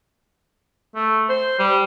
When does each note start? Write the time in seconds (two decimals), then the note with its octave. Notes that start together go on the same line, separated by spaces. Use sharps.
0.95 A3
1.29 C5
1.59 G3